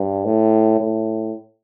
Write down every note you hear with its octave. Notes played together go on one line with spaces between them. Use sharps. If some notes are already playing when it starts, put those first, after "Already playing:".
Already playing: G2
A2
A2